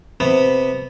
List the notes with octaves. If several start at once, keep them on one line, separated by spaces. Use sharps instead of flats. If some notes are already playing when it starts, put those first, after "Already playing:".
C3 B3